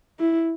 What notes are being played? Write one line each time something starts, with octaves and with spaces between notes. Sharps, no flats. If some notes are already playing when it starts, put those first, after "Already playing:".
E4